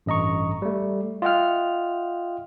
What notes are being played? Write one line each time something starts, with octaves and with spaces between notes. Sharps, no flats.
A1 G2 D#5 A#5 C#6
G3 A3
F4 D#5 E5 F#5 G5 F6